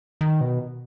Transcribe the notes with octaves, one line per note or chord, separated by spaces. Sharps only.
D#3
B2